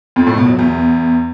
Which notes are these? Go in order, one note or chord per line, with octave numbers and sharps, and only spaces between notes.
F2
A2
B2
F#3
E2